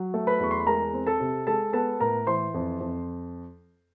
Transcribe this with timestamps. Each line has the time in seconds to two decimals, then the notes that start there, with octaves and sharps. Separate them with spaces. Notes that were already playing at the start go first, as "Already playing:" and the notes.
Already playing: F#3
0.14 A3
0.27 B4 B5
0.40 E2 C#6
0.51 C6
0.60 B5
0.67 G#3 A#4 A#5
0.94 C4
1.07 A4 A5
1.20 C3
1.47 G#3 A4 A5
1.73 B3 A4 A5
2.00 A2 A#4 A#5
2.27 E3 C5 C6
2.54 F2
2.80 F2